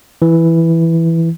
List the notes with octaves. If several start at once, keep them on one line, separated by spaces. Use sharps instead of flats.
E3